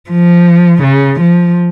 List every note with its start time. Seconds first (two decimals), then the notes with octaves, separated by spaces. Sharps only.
0.10 F3
0.83 C#3
1.21 F3